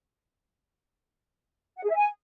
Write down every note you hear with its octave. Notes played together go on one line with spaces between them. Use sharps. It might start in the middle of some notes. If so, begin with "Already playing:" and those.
F#5
G#4
E5
G#5